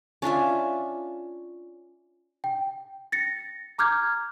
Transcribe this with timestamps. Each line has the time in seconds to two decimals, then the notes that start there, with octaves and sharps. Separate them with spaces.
0.22 C#4 D4 F4 E5
2.44 G5
3.12 A6 A#6 C#7
3.78 A#5 D6 F6 G6 G#6